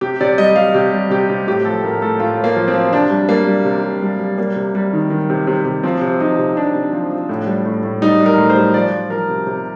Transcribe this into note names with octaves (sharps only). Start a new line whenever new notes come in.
C3 G4
C3 D5
G3 D#5
G3 F5
C3 G4
G3
C3 G4
C3
A2 G4
F3 A4
A2 A#4
A2 A4
A2 F4
A2
A#3
F3
C4
F3
C3 D4
G3
G3 A#3
G3
C3
C3
G3
G3
G3 A#3
C3
G3
D#3
D#3
C3
C3
C3
F3 C4
C3
F3 D#4
C3
C3 D4
C3
F3
F3
A2
G3
A2
A2
G3 D#4
G3
A#4
A2
C5
G3
F3 D5
F3
F3 A#4
C3
C3